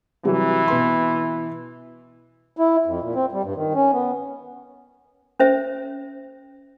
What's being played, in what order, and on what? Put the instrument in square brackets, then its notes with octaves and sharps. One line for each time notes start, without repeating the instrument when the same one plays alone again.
[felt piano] C3 F#3 G3 [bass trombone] E3
[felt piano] B2 B4 C6
[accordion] E4
F2
A#2
C4
G3
G2
D#3
C#4
B3
[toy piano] C#4 C5 E5